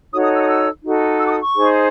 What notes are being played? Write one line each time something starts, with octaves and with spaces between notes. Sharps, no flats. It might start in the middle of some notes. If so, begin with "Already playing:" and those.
D#4 F#4 A4 C#5 D#6
D#6
E6
D#6
E6
D#4 F#4 A4
E6
D6
D#6
C#6
D#4 G#4 C5